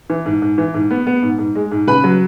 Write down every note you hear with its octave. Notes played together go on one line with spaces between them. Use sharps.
E3
G#2
G#2
E3
G#2
B3
B3
G#2
G#2
G#3
G#2
C#3 B4 B5
F#3